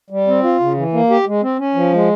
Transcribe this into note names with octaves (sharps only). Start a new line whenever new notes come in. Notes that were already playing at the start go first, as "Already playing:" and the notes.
G3
C4
F4
C#3
E3
A#3
G4
G#3
C4
C#4
F3
G#3